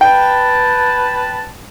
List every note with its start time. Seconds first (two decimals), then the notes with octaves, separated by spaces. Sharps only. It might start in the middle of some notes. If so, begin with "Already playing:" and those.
0.01 B4 G5 A5